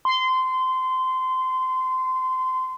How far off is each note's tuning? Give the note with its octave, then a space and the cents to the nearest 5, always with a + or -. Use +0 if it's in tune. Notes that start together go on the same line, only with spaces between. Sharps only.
C6 -20